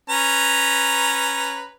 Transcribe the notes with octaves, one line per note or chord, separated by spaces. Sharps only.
C#4 B4 A#5